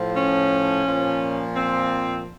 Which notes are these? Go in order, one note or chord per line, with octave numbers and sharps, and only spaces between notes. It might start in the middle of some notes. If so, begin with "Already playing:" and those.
Already playing: A2 F3
C#4
A#2 F3
C4